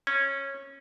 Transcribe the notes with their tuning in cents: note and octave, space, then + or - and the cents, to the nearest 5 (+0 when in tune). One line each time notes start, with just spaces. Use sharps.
C#4 -15